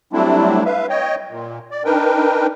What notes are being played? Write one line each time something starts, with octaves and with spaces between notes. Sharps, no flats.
F#3 G3 A3 C4 D4 E4
B4 E5 F5
C#5 D#5 G5
A#2
D5
D4 D#4 A#4 B4 G5